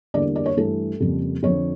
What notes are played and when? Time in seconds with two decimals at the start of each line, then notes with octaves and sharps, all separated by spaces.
0.14 E2 D3 G3 A#3 D5
0.36 D5
0.46 C#5
0.57 G2 E3 A3 A4
1.00 F2 C#3 G3 A#3
1.43 F2 D3 F3 C#5